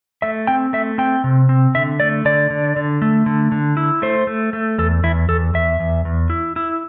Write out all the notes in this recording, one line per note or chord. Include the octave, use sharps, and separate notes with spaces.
A3 E5
C4 G5
A3 E5
C4 G5
C3
C4
D3 E5
A3 D5
D3 D5
D3
D3
A3
D3
D3
E4
A3 C5
A3
A3
E2 A4
E2 E4
E2 A4
E2 E5
E2
E2
E4
E4